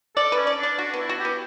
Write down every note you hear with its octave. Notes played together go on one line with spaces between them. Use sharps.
A4 D5
C#4 B4
D5
D4
D5
D4 F#4
B3
E4
F#4
G4
B3